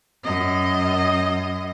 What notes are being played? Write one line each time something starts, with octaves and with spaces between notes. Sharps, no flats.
F#2 D#5